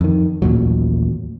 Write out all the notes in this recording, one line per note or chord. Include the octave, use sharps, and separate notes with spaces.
F2 D#3
A1 D#2 A#2 F#3